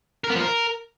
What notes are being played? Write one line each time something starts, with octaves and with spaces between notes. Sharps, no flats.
A#4
B3
F3
A#4